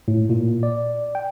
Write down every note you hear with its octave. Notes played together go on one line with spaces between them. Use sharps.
A2
A#2
D5
G5